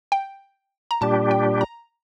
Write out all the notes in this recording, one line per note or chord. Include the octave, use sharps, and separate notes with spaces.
G5
A#5
A#2 G3 D4 G4 A5
G5
A#5